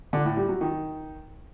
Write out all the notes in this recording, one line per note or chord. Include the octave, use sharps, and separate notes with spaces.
D3
A2
G3
F#3
D#3